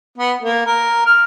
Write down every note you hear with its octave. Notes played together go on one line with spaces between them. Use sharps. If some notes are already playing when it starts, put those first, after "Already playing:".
B3
A#3
A#4
F6